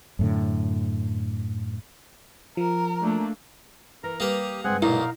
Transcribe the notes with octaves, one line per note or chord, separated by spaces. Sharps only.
F#2 A2 D3
F3 A#4
A3 A#3 D4
E3 A#4 A#5
G3 A#3 G4 A#4 D#6
G2 C#3 G#3 C4 G#4 F#5
B1 A#2 D#4 E4 A#4 F5